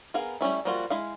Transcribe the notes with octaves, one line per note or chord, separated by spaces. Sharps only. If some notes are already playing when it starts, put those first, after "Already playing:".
B3 G#4 A#4 F5
G3 A3 C#4 E4
F3 G3 A#3 F4 F#4
G#3 E4 F5